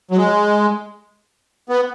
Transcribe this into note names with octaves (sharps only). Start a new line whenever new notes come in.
F#3
G#3
B3